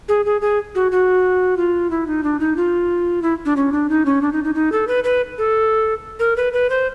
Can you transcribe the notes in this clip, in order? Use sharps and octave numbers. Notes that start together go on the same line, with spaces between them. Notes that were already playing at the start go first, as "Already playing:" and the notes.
G#4
G#4
G#4
F#4
F#4
F4
E4
D#4
D4
D#4
F4
E4
D4
C#4
D4
D#4
C#4
D4
D#4
D#4
D#4
A4
B4
B4
A4
A#4
B4
B4
C5